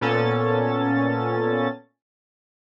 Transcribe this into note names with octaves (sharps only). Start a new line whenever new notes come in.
A#2 B3 C#4 A4 A6